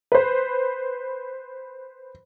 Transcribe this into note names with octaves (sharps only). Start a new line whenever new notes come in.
B4 C5